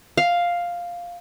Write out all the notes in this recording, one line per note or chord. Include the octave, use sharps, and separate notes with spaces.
F5